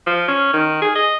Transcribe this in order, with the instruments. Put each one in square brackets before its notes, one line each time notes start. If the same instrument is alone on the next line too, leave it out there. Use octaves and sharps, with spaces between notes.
[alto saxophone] F3
C#4
D#3
G#4
D#5